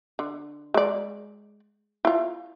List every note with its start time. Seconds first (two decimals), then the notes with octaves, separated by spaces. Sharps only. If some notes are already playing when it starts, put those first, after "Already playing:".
0.19 D3
0.74 G#3 D5
2.05 E4 F4